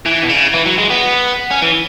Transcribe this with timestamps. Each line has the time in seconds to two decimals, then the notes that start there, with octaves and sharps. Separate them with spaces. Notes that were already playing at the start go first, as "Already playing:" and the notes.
0.06 E3
0.23 B2
0.29 C#3
0.54 E3
0.66 F#3
0.78 G#3
0.90 B3
1.51 C#4
1.62 E3